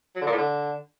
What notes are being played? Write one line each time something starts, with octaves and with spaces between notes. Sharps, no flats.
F#3
D3
A#2
A2
D3